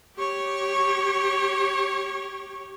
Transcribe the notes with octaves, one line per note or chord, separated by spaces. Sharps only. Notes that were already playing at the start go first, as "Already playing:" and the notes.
G4 C#5